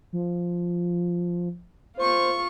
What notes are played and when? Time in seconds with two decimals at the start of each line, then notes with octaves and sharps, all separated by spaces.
0.13 F3
1.97 F4 C5 C#6